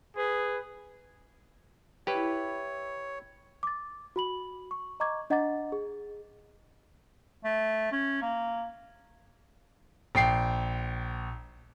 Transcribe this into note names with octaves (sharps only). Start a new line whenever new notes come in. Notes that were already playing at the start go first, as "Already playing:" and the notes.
G#4 B4
E4 G4 B4 C#5
D6 A6
F#4 B5 F#7
C#6
D#5 A#5 C#6 D6 G#6
D4 D#5 F#5 A#5 D6 A6
G#4
A3
C#4
A#3
A#1 G5 C7